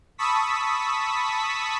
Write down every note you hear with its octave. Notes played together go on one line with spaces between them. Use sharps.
A5 B5 C#6 D#6 E6 B6